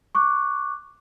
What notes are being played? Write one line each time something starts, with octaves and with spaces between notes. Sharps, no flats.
C#6 D6 F#6